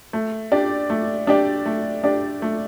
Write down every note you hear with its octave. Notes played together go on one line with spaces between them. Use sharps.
A3
D4 G4 D5
A3
D4 G4 D5
A3
D4 G4 D5
A3